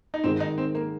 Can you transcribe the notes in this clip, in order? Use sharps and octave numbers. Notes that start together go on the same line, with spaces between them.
D#4
G#2 D#3 G#3 C4
D#4
C4
A#3